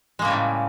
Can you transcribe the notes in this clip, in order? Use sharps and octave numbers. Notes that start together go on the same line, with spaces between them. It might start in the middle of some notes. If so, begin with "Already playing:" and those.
A2 C#3 G3 G#3 A#3